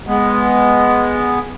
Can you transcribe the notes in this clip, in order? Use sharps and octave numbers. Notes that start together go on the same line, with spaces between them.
G#3 B3